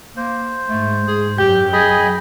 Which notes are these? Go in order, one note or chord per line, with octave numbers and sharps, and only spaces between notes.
A#3 C5
G#2 A3
G#4
F#2 F#3 G4 G5
G#4 D#5 G#5 B5